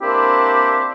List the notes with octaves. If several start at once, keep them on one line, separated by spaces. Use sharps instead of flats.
A#3 C4 D4 E4 G4